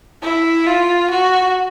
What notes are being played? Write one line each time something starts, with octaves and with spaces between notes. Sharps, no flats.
E4
F4
F#4